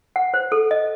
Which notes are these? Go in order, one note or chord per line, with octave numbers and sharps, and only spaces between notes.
F#5
C5
A4
D#5